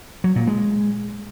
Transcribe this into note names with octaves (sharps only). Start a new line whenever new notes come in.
F#3
A#2
G#3